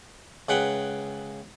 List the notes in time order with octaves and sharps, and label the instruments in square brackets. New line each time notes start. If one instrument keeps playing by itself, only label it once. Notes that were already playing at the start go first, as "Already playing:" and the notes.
[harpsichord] C#2 G#4 B4 F#5 G5